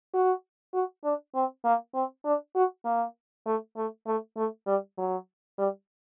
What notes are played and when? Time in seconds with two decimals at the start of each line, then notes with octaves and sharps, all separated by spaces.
0.14 F#4
0.74 F#4
1.04 D4
1.35 C4
1.64 A#3
1.94 C4
2.25 D4
2.55 F#4
2.85 A#3
3.46 A3
3.76 A3
4.06 A3
4.36 A3
4.67 G3
4.98 F#3
5.58 G3